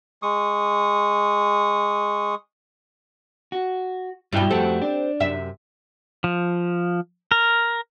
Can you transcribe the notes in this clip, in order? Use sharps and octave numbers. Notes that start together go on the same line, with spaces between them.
G#3 C#6 D#6
F#4
G2 B2 G3 E4 G5
F2 A3 C4 F#4 G4 A4
D4
F#2 C3 E5
F3
A#4